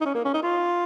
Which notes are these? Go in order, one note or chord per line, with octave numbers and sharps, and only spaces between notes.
D#4
C#4
A#3
C#4
D#4
F4